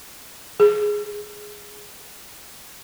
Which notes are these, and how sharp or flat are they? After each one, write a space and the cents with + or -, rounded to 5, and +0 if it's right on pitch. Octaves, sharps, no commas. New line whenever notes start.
G#4 +0